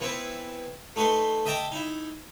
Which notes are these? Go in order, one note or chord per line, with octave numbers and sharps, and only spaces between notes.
E3 B3 C4 E4 B4
A3 D#4 F#4 B4 C6
D#5 E5 G5 A5 A#5 D6
D#4 E4